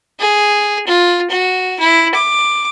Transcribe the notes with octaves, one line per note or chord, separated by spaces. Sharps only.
G#4
F4
F#4
E4
D6